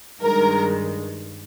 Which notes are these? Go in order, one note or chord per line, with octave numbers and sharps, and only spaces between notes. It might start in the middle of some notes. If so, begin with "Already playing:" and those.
G2 D#3 G#3 A#4